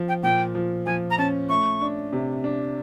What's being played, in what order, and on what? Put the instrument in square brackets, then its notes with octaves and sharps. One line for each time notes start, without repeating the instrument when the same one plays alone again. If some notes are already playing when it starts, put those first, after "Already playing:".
Already playing: [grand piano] F3
[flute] G5
[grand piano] A#2 [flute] G5
[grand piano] F3
[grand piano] F3 [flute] G#5
[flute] A#5
[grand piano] C#4 [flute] A5
[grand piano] A3 [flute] C#6
[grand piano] D4
C3
D4